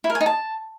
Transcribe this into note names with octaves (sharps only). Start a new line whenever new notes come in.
E4
A#4
G#5
D#4
A5